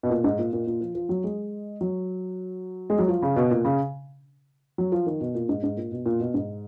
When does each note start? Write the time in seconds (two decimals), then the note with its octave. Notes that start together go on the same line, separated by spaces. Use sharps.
0.03 B2
0.10 A#2
0.24 G#2
0.39 A#2
0.53 A#2
0.67 A#2
0.81 F3
0.95 F3
1.09 F#3
1.24 G#3
1.81 F#3
2.90 G#3
2.98 F#3
3.08 F3
3.22 C#3
3.36 B2
3.51 A#2
3.65 C#3
4.78 F#3
4.92 F3
5.06 D#3
5.21 B2
5.35 A#2
5.49 G#2
5.63 G#2
5.77 A#2
5.92 B2
6.06 A#2
6.20 B2
6.34 G#2